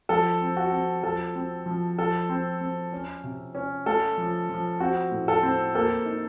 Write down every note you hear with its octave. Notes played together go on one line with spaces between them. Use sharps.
F3 A4
C4
F#4
C4
F3 A4
C4
F3
F3 A4
C4
C4
C#4
C3
C#4
A3 A4
F3
F3
C4 F#4
A2
A4
C4
A#3 A4
D#4